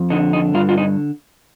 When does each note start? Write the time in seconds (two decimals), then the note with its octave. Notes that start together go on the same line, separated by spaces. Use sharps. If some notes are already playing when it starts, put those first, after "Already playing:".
Already playing: F2
0.10 D3 D#4
0.33 D#4
0.54 G2 F4
0.69 F4
0.78 D#4